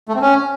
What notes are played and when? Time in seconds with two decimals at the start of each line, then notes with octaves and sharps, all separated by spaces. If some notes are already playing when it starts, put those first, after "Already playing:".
0.09 A3
0.15 C4
0.21 C#4